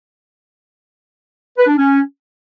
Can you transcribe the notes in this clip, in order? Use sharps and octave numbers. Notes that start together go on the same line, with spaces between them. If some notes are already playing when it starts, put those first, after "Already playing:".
B4
D4
C#4